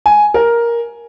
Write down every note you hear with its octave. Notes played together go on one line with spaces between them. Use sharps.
G#5
A#4